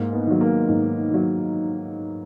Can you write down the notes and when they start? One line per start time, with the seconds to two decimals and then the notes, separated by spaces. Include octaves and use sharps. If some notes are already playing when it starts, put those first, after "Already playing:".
Already playing: G#2 A#3
0.13 B3
0.27 D#3 F#3
0.41 A#3
0.69 G#2
1.10 D#3 F#3